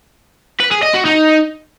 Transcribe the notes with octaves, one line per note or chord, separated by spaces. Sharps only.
B4
G#4
D#5
F#4
D#4